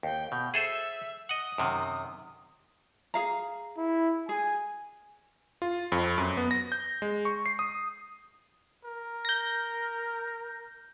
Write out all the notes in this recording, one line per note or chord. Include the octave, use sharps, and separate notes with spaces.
D#2 G5
B2 G6
G#4 A4 C5 E5
D#5 F#5 D#6
F#2 C3 D#3
G#4 F5 A#5
E4
G#4 G#5
F4
F2
F#2
B3
A#6
G6
G#3
C#6
C7
D#6
A#4
G6 A#6